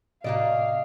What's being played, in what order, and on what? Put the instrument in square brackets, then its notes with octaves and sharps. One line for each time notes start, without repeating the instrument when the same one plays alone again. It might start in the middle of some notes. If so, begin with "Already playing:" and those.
[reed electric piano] A2 C3 [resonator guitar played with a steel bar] A#3 F#4 D5 [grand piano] D#5 [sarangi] F5